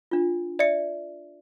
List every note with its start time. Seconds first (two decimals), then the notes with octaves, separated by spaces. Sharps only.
0.11 D4 F4
0.59 D5 E5 C#7